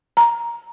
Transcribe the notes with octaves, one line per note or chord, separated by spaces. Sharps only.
A#5